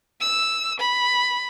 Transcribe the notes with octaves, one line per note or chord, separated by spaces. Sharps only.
E6
B5